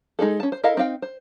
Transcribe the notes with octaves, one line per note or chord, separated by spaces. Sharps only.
G#3 D#4 G#4 A4
C#4 A5
C5
E4 A4 A#4 D#5 F5
C4 D#4 F5 G5
C5